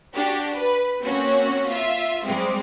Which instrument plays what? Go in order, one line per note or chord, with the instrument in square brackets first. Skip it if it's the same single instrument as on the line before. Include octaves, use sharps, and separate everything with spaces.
[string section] D4 F#4 G4
B4
A#3 C4 C#4 F#4
F4 E5
G3 G#3 C4